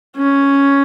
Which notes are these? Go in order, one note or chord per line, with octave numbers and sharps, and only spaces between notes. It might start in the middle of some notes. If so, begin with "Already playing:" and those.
C#4